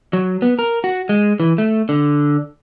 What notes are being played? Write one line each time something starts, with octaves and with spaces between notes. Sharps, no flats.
F#3
B3
A#4
F#4
G#3
E3
A3
D3